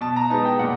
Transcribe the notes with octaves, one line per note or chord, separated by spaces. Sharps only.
B2 A5
A#5
G#3 B3 D#4 A5
G5
A#2 F#5